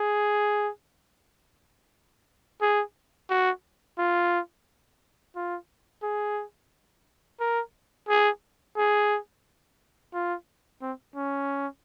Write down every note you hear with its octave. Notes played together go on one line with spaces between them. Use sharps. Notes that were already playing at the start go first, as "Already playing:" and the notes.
Already playing: G#4
G#4
F#4
F4
F4
G#4
A#4
G#4
G#4
F4
C4
C#4